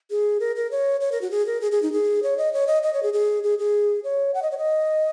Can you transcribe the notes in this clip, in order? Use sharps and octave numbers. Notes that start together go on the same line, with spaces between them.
G#4
A#4
A#4
C#5
C#5
A#4
F#4
G#4
A#4
G#4
G#4
D#4
G#4
C#5
D#5
C#5
D#5
D#5
C#5
G#4
G#4
G#4
G#4
C#5
F#5
D#5
C#5
D#5